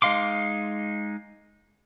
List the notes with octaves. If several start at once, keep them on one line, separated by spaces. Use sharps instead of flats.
G#3 D#4 F5 C6 D6